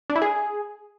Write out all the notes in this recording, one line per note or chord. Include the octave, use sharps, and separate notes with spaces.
D4
E4
G#4